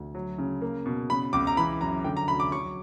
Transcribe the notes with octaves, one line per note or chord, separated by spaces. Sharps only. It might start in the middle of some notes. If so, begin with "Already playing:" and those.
Already playing: D2
F#3
C#3
A#3
B2
C#3 B5
C#2 D6
A#5
E3 B5
F#2 A#5
D3 G5
A#5
D2 B5
D6
F#3 C#6